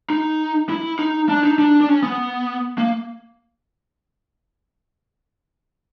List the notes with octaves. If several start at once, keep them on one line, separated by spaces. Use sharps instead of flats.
D#4
E4
D#4
D4
D#4
D4
D4
C#4
B3
A#3